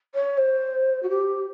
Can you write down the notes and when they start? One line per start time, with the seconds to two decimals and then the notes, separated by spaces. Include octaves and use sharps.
0.15 C#5
0.37 C5
1.03 F#4
1.09 G4